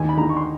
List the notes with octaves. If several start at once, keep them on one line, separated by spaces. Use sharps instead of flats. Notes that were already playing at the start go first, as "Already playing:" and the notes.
Already playing: D#2 G#5
B5
D3 A#5
C#6
C6